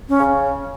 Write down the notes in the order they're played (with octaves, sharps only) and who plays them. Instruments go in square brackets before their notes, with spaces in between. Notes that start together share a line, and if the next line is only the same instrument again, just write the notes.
[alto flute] C#4
[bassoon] C#3